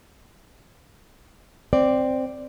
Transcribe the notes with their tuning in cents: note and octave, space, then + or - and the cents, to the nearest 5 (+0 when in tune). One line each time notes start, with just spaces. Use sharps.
C4 +0 D5 +0